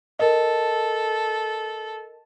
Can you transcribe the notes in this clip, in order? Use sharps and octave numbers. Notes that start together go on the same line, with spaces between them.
A4 A#4 D#5